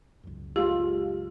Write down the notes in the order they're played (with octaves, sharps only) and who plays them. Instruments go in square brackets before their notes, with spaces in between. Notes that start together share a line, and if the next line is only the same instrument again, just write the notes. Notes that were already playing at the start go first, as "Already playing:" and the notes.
[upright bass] C#2 F#2
[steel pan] G#3 F4 [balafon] G4